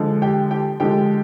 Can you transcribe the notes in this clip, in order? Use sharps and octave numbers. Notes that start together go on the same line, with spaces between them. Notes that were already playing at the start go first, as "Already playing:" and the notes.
Already playing: D3 F3 G#3
G4 G5
G4 G5
D3 F3 G#3 G4 G5